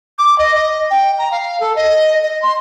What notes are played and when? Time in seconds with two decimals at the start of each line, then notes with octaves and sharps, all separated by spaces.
0.18 D6
0.38 D#5
0.55 D#5
0.90 G5
1.18 A#5
1.31 F5
1.60 A4
1.76 D#5
2.23 D#5
2.42 C6